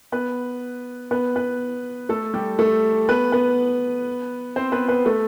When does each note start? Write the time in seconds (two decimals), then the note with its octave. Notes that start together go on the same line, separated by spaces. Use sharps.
0.12 B3 B4
1.11 B3 B4
1.36 B3 B4
2.09 A3 A4
2.34 G3 G4
2.59 A3 A4
3.09 B3 B4
3.32 B3 B4
4.56 C4 C5
4.72 B3 B4
4.89 B3 B4
5.05 A3 A4